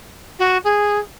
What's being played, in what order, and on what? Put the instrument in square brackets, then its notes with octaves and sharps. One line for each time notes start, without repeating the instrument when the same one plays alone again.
[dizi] F#4
G#4